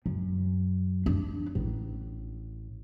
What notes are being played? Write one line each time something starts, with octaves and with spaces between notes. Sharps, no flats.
F#2
D4
A1